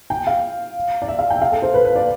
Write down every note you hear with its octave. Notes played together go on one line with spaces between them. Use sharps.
G5
F5
D5
E5
F5
G5
E5
F5
A4
C5
B4
B4
D5